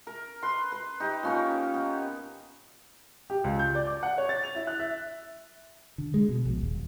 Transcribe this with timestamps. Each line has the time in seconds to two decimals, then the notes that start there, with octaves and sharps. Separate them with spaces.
0.07 A#4
0.43 B4 C6
0.72 B4
1.00 D#4 G4
1.23 A#2 C#4 A#4
1.74 B3
3.30 G4
3.44 C#2
3.59 G6
3.75 D5
3.87 D6
4.03 F#5
4.18 C#5
4.29 A6
4.43 F7
4.55 E4
4.67 F#6
4.79 E5
5.98 D3
6.14 G#3
6.29 B2
6.45 A#1
6.61 D#1